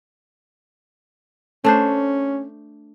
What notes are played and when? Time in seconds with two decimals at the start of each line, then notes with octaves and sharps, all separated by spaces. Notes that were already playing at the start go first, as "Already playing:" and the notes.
1.64 A3 C#4 D4 C5